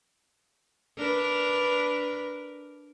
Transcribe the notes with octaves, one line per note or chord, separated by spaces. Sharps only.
D4 A#4 B4